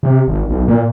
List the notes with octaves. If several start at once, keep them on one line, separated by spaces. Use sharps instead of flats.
C3
G#1
B1
A#2